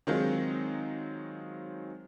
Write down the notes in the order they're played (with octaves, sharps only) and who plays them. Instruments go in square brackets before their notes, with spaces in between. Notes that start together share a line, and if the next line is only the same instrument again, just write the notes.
[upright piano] D#3 F#3 G#3 C4 D#4 F4